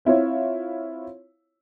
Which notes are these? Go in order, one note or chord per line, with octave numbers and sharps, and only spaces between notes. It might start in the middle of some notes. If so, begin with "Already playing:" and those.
C4 E4 F4 C#5